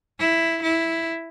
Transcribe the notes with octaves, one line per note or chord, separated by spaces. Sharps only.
E4
E4